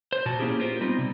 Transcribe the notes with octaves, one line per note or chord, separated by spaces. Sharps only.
C5
A#2 F#4 A5
A#3 B3 C#4 E4 G4 G#4
F4 G4 A#4 C5
G3 B3 C4 D#4
C3